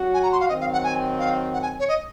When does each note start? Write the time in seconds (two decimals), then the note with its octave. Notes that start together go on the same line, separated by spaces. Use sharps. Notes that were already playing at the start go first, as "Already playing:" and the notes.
Already playing: F#3 C#4 F#4
0.14 G#5
0.23 A#5
0.32 C6
0.41 F5
0.49 D#3 F#3 C4 D#5
0.61 F5
0.73 F#5
0.84 G#5
1.19 F5
1.53 F#5
1.62 G#5
1.79 C#5
1.88 D#5